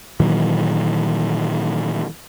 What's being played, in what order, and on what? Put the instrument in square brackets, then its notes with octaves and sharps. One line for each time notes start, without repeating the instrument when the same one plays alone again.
[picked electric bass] A#2 D#3 E3 F#3